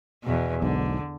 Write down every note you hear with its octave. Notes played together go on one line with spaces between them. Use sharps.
E2 B2
B1 G#2 D3